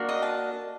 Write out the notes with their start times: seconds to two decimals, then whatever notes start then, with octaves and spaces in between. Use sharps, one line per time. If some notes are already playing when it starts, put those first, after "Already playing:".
Already playing: A#3 D4 F#4
0.09 D#5
0.23 A5